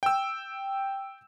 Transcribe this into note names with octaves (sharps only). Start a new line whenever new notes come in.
G5 E6